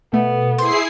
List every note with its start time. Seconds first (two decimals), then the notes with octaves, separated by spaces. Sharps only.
0.13 B2 A3 B3
0.58 E4 G#4 C5 C7